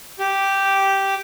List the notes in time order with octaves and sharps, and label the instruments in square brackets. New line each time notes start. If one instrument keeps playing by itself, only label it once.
[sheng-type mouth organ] G4